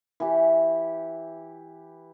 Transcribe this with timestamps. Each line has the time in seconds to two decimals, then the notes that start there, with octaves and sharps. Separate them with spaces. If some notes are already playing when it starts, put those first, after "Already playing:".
0.20 E3 G4